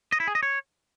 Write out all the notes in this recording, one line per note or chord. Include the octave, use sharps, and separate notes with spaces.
D#5
E4
G#4
D#5
C#5